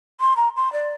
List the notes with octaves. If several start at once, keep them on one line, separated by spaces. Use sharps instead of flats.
C6
A#5
C6
D5